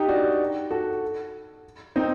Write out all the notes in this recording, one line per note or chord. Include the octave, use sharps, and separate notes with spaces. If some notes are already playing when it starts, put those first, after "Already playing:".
Already playing: D#4 G4
D4 F#4
F#4 A4
C4 D#4